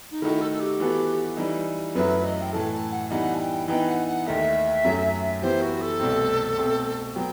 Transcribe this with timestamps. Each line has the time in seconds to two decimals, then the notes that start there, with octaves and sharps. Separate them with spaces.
0.11 D#4
0.21 D#3 A3 D#4 E4 F#4
0.41 A4
0.51 A4
0.60 G4
0.80 E3 B3 F#4 A4
1.37 E3 G3 D#4
1.95 F#2 F#3 A3 E4 B4
2.24 D#5
2.41 G5
2.53 A2 E3 A3 A5
2.72 A5
2.91 F#5
3.10 E3 G3 B3 D#4 F#5
3.35 A5
3.40 G5
3.68 E3 B3 D#4 G5
3.88 F#5
4.07 F#5
4.26 D#2 D#3 A3 D#4 E5
4.84 F#2 F#3 A3
5.42 E3 B3 E4 G4 C5
5.61 F#4
5.81 A4
6.00 C2 B2 A3 C4
6.57 B2 A3 C4
7.15 F#3 B3 G5